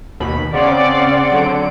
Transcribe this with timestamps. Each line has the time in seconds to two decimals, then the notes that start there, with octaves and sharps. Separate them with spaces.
0.20 D#2 B2 B5
0.54 C#3 C4 C#4 D5 F5 F#5 C6
1.30 D3 F#3 D7